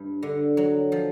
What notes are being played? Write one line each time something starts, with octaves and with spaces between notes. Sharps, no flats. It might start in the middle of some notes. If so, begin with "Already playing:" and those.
Already playing: G2
D3
F#3
F3